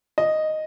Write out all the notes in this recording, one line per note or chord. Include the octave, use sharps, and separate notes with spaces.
D#5